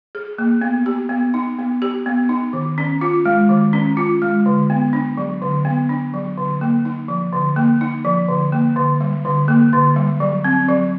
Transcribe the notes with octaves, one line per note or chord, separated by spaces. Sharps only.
G#4
A#3
B3
G4
B3
D#4
B3
G4
B3
D#4
D#3
C#4
F4
G#3
D#3
C#4
F4
G#3
D3
B3
D4
F#3
D3
B3
D4
F#3
D3
A#3
D#4
F3
D3
A#3
D#4
F3
D3
A#3
D3
G3
D3
A#3
D3
G3
F#3
C4
F#3